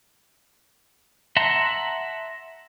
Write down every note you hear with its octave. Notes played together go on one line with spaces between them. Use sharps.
E5 F#5 A5 A#5 C6